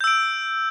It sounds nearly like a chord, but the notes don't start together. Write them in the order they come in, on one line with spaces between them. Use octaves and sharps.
G6 E6 D7